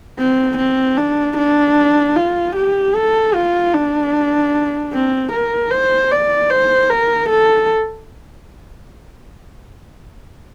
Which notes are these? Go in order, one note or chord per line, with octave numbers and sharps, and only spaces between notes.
C4
C4
D4
D4
F4
G4
A4
F4
D4
C4
A#4
C5
D5
C5
A#4
A4